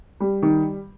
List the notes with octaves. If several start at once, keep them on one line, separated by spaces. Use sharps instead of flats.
G3
D#3